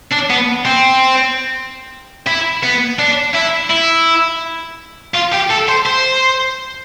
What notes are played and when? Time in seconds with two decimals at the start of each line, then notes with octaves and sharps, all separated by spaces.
0.12 D4
0.30 B3
0.65 C4
2.27 E4
2.63 B3
2.99 D4
3.35 E4
3.70 E4
5.14 F4
5.32 G4
5.50 A4
5.68 C5
5.86 C5